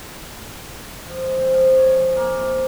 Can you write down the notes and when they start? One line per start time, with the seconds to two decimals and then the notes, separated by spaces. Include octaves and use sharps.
1.06 F3
1.22 G#3
1.38 C4
1.52 F3
1.76 C#5
1.97 G#5
2.16 A#3
2.34 C3